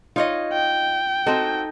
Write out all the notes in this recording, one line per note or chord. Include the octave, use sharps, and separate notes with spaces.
D#4 F4 C#5 D#5
G5
C4 D#4 F#4 A4 D#5